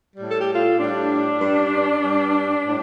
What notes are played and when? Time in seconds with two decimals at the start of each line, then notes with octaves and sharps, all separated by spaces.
0.17 A2 G3
0.30 A4
0.41 G4
0.54 F4 A4
0.80 A2 G3 D4
1.41 G2 G3
2.03 G2 G3
2.65 A2 G3